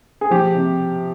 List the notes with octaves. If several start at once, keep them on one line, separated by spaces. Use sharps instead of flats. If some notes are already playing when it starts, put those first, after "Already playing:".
G#4
F3 G4
C3